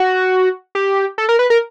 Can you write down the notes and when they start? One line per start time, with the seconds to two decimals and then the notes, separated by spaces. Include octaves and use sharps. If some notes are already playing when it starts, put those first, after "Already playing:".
Already playing: F#4
0.75 G4
1.18 A4
1.29 A#4
1.39 B4
1.50 A#4